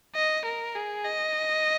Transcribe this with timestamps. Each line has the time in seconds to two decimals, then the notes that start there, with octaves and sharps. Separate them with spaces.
0.15 D#5
0.45 A#4
0.75 G#4
1.04 D#5